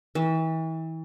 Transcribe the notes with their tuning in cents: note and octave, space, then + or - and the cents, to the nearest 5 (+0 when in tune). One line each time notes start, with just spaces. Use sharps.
E3 -35